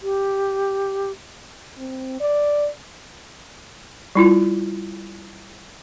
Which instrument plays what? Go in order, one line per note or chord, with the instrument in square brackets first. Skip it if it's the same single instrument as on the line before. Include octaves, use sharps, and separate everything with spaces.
[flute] G4
[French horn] C4
D5
[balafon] G3 E4 F4